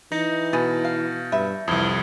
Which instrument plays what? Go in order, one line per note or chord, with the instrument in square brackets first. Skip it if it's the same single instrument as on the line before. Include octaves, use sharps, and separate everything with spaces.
[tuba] E3 [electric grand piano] D#4 [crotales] G6 A#6 C#7
[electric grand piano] B2 [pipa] B3 E4 G#4 [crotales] A6
[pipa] F5
[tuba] G2 [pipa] B4 E5
[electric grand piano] C2 F2 [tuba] E3 [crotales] D#6 G#6 G7